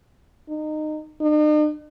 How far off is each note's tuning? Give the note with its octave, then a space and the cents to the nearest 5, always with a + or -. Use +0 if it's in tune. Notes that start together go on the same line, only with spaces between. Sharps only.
D#4 -20
D#4 -45